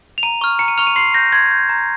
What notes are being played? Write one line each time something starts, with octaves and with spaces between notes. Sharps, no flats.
F7
A#5 D#7
C#6 F6
A#5 C#7
D#7
C#6 F6 F7
D#7
C6 C7
G6 A#6
C6 G#6
G6
A#5